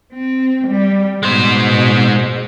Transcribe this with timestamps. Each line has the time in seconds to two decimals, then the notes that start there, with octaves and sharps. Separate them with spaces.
0.13 C4
0.67 G3
1.23 B2 G#3 C5